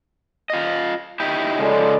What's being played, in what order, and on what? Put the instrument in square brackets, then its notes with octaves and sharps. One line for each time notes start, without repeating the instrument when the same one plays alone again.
[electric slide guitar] F4 D#5
D#4 E4 G4
[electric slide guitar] C#3 F3 G#3 [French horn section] A4 D5 D#5